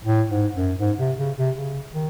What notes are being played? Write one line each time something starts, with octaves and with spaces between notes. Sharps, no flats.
A2
G#2
F#2
G#2
C3
C#3
C3
C#3
D#3